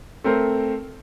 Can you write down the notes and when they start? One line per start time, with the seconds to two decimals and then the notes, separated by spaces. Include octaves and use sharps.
0.24 A3 C4 A#4 C5